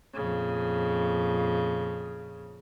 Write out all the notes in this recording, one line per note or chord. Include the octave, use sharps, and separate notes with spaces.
F2 A#2 C#3